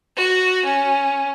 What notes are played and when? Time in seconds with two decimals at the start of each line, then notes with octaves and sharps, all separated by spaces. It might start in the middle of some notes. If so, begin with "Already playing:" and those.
0.16 F#4
0.65 C#4